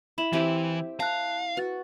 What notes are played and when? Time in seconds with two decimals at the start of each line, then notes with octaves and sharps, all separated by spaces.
0.18 E4 B5 E7 F#7
0.33 E3 C4 E4 G4
1.00 F5 A5 A#5 F#6
1.57 F#4 B4 A6